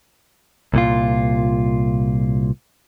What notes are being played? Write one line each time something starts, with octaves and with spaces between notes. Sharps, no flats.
C2 A#2 F4